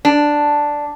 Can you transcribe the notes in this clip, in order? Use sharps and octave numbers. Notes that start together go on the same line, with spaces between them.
D4